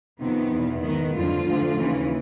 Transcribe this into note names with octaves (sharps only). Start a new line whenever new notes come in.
F2 C3 D#3 B3
E2 B2
G#2 D#3 B3
F2 D3 F3 F4
D2 D3 F3
D#2 C#3 E3